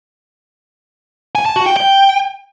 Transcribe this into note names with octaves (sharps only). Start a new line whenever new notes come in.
G#5
A5
F#4
G5
G5